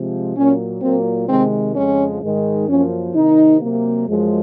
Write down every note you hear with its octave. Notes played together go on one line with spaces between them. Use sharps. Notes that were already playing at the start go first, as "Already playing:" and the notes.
Already playing: C3 F3 G#3
A#2 F#3 A#3 C#4
A#2 F#3 A#3 C4
C3 D#3 G#3 C4
F2 C#3 F3 G#3 C#4
G#2 D#3 G#3
F#2 F3 A#3 C#4
C3 D#3 A#3 D#4
C3 F#3 A#3
F#2 F3 G#3